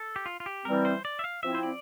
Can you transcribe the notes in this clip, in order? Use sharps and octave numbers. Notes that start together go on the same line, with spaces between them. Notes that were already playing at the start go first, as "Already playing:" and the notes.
Already playing: A4
G4
F4
F4
G4
E3 G3 C4 A#4
C5
D5
E5
F5
F3 C4 E4 E5
C5
D5